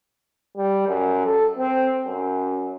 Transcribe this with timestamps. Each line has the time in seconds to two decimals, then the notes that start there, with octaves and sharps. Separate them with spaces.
0.57 G3
0.88 F#2
1.26 A4
1.58 C4
2.06 F#2